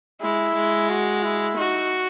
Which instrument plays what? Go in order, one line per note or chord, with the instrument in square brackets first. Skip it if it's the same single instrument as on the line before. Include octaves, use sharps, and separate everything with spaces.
[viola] G#3 [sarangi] E4
[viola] G#3
[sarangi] F#4
E4
[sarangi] D#4 [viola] F#4